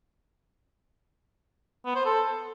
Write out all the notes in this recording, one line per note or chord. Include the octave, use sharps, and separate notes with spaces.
B3
C5
A4